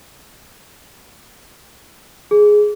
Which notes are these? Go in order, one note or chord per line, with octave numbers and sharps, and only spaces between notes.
G#4